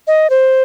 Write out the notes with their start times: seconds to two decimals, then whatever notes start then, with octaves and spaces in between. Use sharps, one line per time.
0.07 D#5
0.30 C5